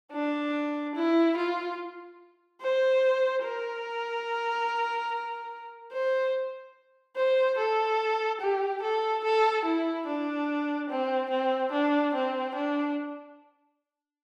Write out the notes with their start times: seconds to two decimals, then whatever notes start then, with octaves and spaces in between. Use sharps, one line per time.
0.12 D4
0.95 E4
1.37 F4
2.61 C5
3.43 A#4
5.93 C5
7.16 C5
7.58 A4
8.41 G4
8.82 A4
9.24 A4
9.65 E4
10.07 D4
10.90 C4
11.30 C4
11.72 D4
12.14 C4
12.55 D4